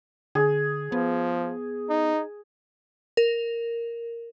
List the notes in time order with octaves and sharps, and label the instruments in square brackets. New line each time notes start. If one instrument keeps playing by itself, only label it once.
[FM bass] D3 [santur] G#4
[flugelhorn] F3 [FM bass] B3
[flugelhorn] D#4
[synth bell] A#4